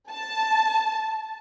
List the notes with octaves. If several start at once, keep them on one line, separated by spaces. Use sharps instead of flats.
A5